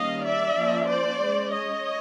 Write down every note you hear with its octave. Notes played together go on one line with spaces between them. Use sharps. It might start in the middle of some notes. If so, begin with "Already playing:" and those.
Already playing: D#3 G3 A#3 C#4 D#5 F5
D5 E5
F3 A#3 C#4
C5 D5
G#3 C#4
C#5 D#5